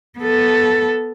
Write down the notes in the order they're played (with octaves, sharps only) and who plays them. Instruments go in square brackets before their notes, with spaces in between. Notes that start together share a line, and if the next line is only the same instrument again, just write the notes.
[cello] B3 A4